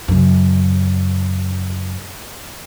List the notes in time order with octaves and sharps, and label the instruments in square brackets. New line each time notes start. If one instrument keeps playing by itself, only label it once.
[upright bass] F#2 C#3